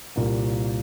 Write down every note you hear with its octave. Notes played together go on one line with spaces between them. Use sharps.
C2 A#2 A#3